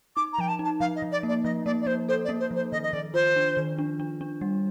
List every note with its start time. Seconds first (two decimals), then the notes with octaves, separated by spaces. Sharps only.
0.16 D#4 D6
0.33 A#5
0.38 F3 G5
0.48 A5
0.59 D#4
0.65 A5
0.80 F3 F5
0.96 D#5
1.02 F3
1.12 D5
1.23 A#3
1.29 D5
1.44 F3 D#5
1.66 A#3 D5
1.81 D5
1.86 A#3 C5
2.09 A4 C5
2.24 D5
2.29 A#3
2.40 C5
2.51 F3 C5
2.72 D#3 D#5
2.83 D#5
2.93 D#3 D5
3.14 F4 C5
3.36 D4
3.57 D#3
3.79 D4
4.00 D4
4.21 D4
4.41 G3